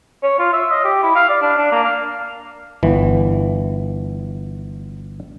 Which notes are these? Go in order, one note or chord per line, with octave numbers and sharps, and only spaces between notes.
C#5
F4
E5
D#5
G4
E4
F5
D5
D4
D4
A#3
F5
G1 E3